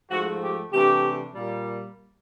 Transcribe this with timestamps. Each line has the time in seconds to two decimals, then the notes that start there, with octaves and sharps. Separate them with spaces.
0.11 G#2 F3 A3 F#4
0.42 G4
0.73 C3 E3 A3 D4 G4
1.34 A#2 G3 A#3